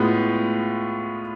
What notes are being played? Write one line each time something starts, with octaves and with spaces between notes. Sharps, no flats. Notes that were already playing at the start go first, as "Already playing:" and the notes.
Already playing: A2 G#3 B3 F4